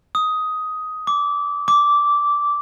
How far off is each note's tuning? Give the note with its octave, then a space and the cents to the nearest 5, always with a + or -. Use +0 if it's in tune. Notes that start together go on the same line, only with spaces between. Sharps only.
D#6 +10
D6 -20
D6 -10